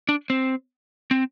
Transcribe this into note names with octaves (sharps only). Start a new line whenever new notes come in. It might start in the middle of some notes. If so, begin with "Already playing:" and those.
D4
C4
C4